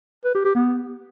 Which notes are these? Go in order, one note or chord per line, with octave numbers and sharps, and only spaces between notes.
B4
G4
G4
B3